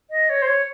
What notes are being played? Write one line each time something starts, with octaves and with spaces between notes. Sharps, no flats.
D#5
C#5
C5
C#5